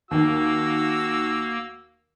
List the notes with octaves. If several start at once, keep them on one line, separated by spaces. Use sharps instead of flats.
D#2 D#3 A#3 F#4 E6